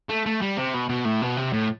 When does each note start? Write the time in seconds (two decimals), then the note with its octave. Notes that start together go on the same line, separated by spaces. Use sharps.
0.09 A3
0.26 A3
0.42 G3
0.58 C3
0.74 B2
0.89 B2
1.05 A2
1.22 B2
1.37 C3
1.53 A2